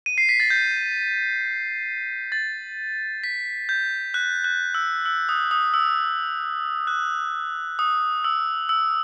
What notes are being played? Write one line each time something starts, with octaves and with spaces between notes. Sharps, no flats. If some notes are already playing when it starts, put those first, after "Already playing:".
D#7
C7
B6
A6
G6
A6
B6
G6
F#6
F#6
E6
E6
D#6
D#6
E6
F#6
D#6
E6
E6